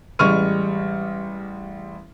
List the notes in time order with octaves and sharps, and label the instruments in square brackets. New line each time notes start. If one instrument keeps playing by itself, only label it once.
[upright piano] A1 G3 G#3 C#6 F6 D#7